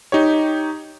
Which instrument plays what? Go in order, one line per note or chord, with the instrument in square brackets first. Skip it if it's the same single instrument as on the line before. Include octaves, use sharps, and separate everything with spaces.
[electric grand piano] D#4 G4 C#5